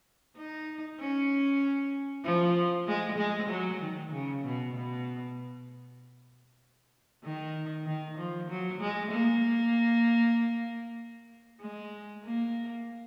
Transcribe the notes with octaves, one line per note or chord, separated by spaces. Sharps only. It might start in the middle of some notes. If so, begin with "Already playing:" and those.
D#4
C#4
F3
G#3
G#3
F#3
D#3
C#3
B2
B2
D#3
D#3
F3
F#3
G#3
A#3
G#3
A#3